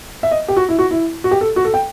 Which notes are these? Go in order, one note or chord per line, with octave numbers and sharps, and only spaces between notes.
E5
D#5
G4
F#4
E4
F#4
E4
F#4
G4
A4
F#4
A4
G5